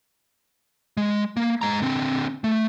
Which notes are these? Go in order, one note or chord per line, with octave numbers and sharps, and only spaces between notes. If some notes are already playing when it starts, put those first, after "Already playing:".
G#3
A#3
G#3 A#5
D3 C4
A3